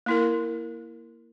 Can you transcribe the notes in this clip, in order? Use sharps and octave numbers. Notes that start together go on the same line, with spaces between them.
A#3 E4 A#4